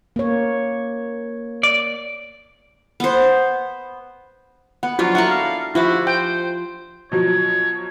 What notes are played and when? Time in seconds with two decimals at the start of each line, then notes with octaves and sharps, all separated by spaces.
0.16 A#3 C#5
1.63 D5
3.00 B3 C5
4.83 B3 F#5
4.99 F3 F#3 D4 F4 F#4
5.15 E4 A4 A#4 F#5
5.30 F5
5.75 F3 E4 F#4 G4 D6
6.07 C5 G5
7.12 B2 F3 F#3 C#5